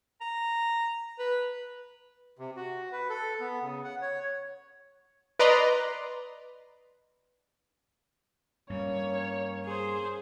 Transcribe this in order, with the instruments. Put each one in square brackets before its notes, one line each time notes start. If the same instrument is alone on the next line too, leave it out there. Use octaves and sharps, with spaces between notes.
[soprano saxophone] A#5
B4
[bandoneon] C3
F#4
B4
A4
B3
C#3
F#5
C#5
[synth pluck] B4 D5 D#5 A#5 C6
[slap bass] G2 G3 [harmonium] A#3 C#4 [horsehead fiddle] C#5
[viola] G#4 C5